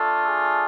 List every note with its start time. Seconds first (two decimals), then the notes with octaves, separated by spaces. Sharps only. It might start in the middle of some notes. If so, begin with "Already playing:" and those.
Already playing: A3 D4 F4 A4
0.26 G#4